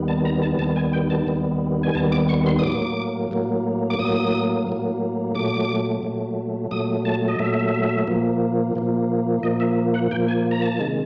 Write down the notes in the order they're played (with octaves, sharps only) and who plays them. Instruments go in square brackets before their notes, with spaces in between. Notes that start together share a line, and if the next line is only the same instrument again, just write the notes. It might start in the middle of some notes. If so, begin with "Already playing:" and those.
Already playing: [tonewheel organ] D#2 D#3 G3 B3
A5
A#5
A5
D#2 D#3 G3 B3 A5
G#5
G5
A5
D#2 D#3 G3 B3
G#5
D#2 D#3 G3 B3 A5
D6
C#6
C6
D#6
A2 F#3 A#3 D6
A2 F#3 A#3
D6
A2 F#3 A#3 D#6
A2 F#3 A#3
A#2 F#3 A3 D6
A#2 F#3 A3
A#2 F#3 A3 D#6
A5
D#5
A#2 F#3 A3 E5
A#2 F3 A#3
A#2 F3 A#3
A#2 F3 A#3 D#5
E5
F#5
A#2 F3 A#3 G5
G#5
A#5
A5
C3 D#3 G#3